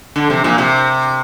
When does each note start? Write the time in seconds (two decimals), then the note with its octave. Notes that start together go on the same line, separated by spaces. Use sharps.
0.16 D3
0.30 C3
0.44 A#2
0.58 C3